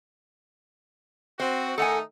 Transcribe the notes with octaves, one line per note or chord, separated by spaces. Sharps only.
C4 F#4 C5
D#3 A3 D#4 A4 F#5 G#5